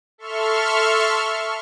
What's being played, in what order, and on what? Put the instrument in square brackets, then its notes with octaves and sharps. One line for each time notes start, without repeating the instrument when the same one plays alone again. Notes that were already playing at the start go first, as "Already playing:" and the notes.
[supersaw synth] A4 E5 C6 C#6 F6